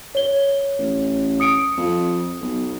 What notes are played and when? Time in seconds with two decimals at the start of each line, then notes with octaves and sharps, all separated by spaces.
0.15 C#5 G7
0.79 A1
1.40 D#6 C#7 D7
1.77 F2
2.41 B1